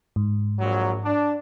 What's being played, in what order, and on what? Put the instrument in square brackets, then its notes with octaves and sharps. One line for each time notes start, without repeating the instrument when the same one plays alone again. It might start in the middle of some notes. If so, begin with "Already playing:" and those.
[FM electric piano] G#2
[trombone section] A#1 F#3
D4